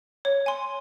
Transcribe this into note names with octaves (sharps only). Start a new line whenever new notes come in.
C#5
G#5 C6